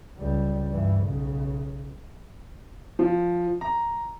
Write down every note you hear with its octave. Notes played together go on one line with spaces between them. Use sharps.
C#2 G3
G2 E3
B1 C#3
F3
A#5